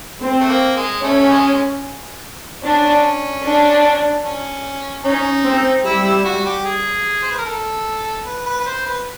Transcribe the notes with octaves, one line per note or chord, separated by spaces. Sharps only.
C4
A3
A#3
G#3
A3 C#4
G#3
C#4 D4
D4
C#4
C#4 D#4
C4
G3 E4
E4
F#4
G4
G#4
C5
B4
A#4
A4
B4
B4
B4
C5
B4